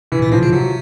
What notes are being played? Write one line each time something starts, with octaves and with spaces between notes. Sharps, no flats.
C3 E3
A#2
B2 F3
C#3
C3 F#3